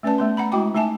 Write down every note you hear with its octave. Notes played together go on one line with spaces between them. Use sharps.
A3 C#4 B4 D5 A5
A3 B3 C6
F#5 A#5 B5
G#3 E4 F#4 G5 D6
A3 D#4 E5 G#5 A5